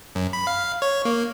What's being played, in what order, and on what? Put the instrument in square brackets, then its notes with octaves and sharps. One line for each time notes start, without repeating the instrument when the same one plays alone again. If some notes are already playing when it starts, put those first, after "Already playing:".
[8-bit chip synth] F#2
B5
F5
C#5
A#3